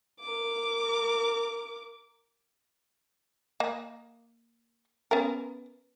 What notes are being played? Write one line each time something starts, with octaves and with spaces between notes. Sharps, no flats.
A#4 D6
A#3 D#5
B3 C#4 A#4